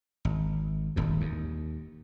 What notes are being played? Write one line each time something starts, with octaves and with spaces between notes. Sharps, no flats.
G#1
D#1 G#1 F#2
D#2